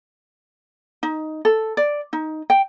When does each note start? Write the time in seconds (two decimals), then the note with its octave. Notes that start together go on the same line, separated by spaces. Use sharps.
1.03 D#4
1.45 A4
1.77 D5
2.13 D#4
2.50 G5